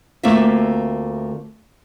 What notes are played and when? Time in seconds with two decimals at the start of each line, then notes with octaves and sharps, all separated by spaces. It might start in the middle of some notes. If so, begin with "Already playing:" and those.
0.23 D2 A3 A#3 C4 F4 E5